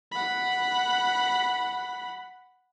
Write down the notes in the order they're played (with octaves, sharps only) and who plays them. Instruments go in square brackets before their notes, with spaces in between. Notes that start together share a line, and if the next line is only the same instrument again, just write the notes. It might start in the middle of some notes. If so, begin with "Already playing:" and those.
[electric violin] F#5 B5